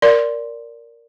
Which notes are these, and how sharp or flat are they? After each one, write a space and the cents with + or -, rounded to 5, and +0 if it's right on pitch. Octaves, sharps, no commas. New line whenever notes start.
A#4 +0 D5 -10 C6 +0